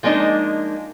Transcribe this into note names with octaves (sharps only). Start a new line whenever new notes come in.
F3 G#3 A#3 D4 D#4